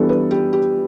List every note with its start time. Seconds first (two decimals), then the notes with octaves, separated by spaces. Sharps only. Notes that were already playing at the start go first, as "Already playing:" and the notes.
Already playing: E3 G3 B3 D4 A4
0.09 B4
0.31 G4
0.53 G4